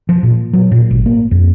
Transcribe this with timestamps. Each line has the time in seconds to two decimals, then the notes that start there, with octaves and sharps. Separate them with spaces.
0.09 F3
0.23 A#2
0.53 F#3
0.72 A#2
0.91 G#1
1.06 A#3
1.31 F2